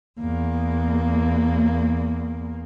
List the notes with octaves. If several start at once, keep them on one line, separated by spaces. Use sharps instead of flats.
E2 A#3